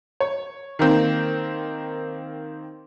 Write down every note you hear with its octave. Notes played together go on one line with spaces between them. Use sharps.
C#5
D#3 A#3 C4